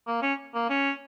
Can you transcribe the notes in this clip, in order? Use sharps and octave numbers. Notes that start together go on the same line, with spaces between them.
A#3
C#4
A#3
C#4